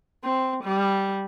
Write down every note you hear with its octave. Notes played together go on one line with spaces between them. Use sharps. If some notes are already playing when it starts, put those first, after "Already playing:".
C4
G3